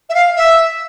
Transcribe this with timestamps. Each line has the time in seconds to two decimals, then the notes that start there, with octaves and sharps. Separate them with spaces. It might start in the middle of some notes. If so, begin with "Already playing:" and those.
0.09 E5
0.14 F5
0.36 E5